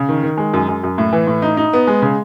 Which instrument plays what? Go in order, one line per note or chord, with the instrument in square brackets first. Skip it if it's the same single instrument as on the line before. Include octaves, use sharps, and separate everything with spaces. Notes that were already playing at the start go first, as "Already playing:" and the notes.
Already playing: [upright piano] C#3
D#3
D#3
G#3
F#2
F#2
F#2
A2
E3
A2
D#4
D#4
B3
G#3
C#3